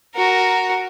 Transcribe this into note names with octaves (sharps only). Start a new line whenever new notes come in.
F#4 A#4